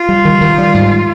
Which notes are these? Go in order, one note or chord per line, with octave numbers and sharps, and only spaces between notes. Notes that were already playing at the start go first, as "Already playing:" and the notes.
Already playing: F4
G3
D#3
D#3
G3
G#2